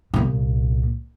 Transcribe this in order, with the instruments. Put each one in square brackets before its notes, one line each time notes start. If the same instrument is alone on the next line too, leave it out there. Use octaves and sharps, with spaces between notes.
[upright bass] C2 A#2